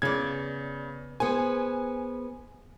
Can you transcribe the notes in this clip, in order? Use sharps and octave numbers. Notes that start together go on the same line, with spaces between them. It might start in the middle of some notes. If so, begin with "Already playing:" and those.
C#3 B3 D5 G#6
B3 G#4 C5 G#5